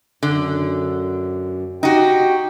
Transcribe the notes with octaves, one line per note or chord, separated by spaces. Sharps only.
F#2 D3
D#4 F#4 G4 G5